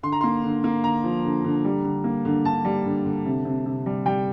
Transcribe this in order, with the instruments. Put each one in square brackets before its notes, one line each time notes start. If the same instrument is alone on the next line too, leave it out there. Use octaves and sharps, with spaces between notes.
[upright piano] D3 C6
A#5
A#3 C6
D3
A#3
D3 A#5
F3
D3
D3
G3
D3
A#3
D3
D3 A5
G3
D3
D3
C3
C3
C3
G3
G3 G5